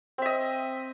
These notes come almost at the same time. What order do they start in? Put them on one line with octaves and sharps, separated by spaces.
C4 E5 D#5